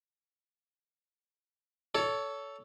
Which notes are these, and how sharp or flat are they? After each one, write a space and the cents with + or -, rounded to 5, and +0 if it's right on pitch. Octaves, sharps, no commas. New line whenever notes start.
A4 +0 C#5 +25